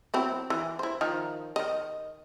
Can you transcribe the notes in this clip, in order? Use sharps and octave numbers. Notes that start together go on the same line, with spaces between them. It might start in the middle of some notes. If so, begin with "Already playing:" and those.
F#3 C4 E4
E3
E4 C5
D#3 F3 D#4
D#3 D#5